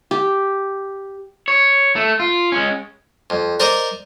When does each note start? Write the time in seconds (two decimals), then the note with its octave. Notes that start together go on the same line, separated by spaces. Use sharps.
0.11 G4
1.48 C#5
1.96 A3
2.20 F4
2.52 G#3 C#4
3.30 F2
3.60 A#4 C5 D5 D#5 A#5 C6